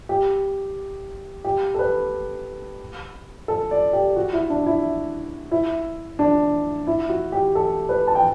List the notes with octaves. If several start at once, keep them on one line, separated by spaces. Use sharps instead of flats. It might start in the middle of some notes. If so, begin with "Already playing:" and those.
G4
G4
A4
B4
A4
D5
G4
F#4
E4
D4
E4
E4
D4
E4
F#4
G4
A4
B4
A5
G5